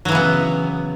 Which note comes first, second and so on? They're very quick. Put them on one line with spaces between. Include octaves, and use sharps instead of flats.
F#3 E3 C#3 B3